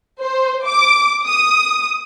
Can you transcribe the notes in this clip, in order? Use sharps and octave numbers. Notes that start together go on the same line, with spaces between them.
C5
D6
D#6